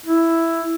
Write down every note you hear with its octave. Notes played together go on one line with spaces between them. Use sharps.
E4